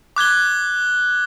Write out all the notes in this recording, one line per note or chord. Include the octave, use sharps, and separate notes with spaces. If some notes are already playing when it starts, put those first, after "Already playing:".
D6 F#6 G#6 G7